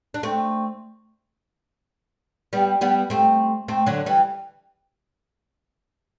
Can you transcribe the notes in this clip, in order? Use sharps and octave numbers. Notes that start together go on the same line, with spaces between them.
D4
A3 C4
G3 B3
G3 B3
A3 C4
A3 C4
D3 F#3
E3 G3